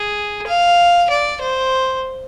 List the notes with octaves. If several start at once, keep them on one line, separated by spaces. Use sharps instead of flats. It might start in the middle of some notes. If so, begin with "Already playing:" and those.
Already playing: G#4
F5
D5
C5